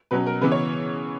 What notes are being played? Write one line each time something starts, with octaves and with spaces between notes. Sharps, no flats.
B2 F#3 C#4 B4
A#4
C#3 E3 B3 B4
C#5